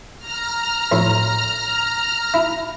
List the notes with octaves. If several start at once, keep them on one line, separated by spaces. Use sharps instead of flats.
A#5 F6
F2 A2
E4